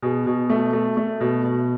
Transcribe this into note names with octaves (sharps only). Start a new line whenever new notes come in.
B2 G#4
B2
A3
A3
A3
B2
B2